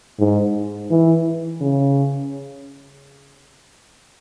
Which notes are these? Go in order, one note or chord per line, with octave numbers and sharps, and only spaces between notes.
G#2
E3
C#3